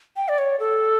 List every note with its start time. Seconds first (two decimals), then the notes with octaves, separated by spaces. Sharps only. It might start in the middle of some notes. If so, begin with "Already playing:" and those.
0.17 G5
0.28 D5
0.38 C#5
0.60 A4